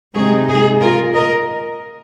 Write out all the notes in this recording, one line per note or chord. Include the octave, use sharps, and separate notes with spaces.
C3 G#3 D#4 G#4
G#4
F4 A#4
A#4 D#5